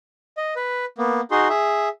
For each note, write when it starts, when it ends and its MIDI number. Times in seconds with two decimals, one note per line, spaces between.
0.37 0.54 75
0.56 0.85 71
0.98 1.21 58
0.98 1.21 59
1.31 1.48 63
1.31 1.48 66
1.31 1.48 68
1.31 1.48 84
1.49 1.89 68
1.49 1.89 76